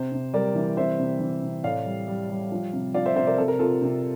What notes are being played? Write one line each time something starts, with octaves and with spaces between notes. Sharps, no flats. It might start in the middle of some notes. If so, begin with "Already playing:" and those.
Already playing: C3 C5
C3
G3 A#4 D5
E3
C3 C5 E5
C3
E3
C3
A2 D5 F5
G3
G3
G3
F3
C3
F3 D5 F5
C5 E5
C3 C5 E5
A#4 D5
C3 A4
A#4
C3 F4 A4
C3